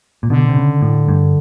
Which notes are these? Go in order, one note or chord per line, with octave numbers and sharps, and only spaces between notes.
A#2
B2 D3
C3
C#3
A2
G2